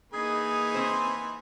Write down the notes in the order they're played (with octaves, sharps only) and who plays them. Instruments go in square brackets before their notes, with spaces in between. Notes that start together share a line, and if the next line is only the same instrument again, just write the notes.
[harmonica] E3 B4 G#5 [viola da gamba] A#3 D#4 [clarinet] G#4
[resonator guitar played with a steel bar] C4 C5